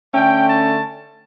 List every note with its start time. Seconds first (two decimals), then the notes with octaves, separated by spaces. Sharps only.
0.12 D3 A3 C#4 G5
0.46 A5